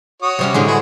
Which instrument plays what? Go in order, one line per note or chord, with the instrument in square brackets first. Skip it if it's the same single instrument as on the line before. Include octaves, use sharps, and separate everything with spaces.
[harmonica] F#4 C#5 D#6
[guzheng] C3 G3 C#4
A2 D3 G#3
[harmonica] F#4 G#4 B4